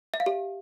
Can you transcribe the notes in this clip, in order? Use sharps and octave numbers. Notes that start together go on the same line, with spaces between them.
E5
F5
G4